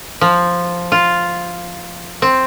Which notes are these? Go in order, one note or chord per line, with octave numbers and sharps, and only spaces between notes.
F3
F4
C4